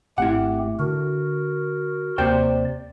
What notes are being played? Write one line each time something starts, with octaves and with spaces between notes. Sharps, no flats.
G#1 A3 C4 E4 G4 F#5
D3 F#4 A#4
D#2 C3 A#3 C5 D5 G5